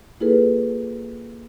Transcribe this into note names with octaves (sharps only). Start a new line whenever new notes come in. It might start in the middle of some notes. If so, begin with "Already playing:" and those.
A#3 E4 F4 G#4 A4 B4